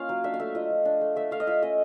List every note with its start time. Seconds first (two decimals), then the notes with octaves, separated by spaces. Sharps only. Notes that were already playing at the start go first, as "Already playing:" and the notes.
Already playing: A#3 C#4 F4 F5
0.09 F#3
0.24 D4 E5
0.34 F5
0.40 A3 E5
0.55 F4 D#5
0.70 F3
0.85 D4
1.01 A3
1.16 A3 E5
1.31 A3 F5
1.40 D#5
1.47 F4 E5
1.62 C#4 D#5